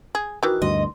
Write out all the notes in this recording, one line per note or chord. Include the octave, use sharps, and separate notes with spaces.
G#4
D#3 E3 F#4
D2 G2 D#5 C6